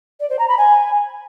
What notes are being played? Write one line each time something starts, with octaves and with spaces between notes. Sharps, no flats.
D5
C5
A#5
B5
G#5